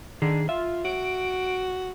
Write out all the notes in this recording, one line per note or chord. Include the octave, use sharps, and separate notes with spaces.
D3 D#3 G#4
F4 E5
F#4 D7